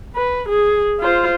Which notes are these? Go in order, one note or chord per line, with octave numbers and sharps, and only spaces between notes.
B4
G#4
F4 C5